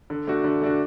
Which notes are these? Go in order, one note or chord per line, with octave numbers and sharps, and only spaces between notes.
D3
A3 D4 F#4
D3
A3 D4 F#4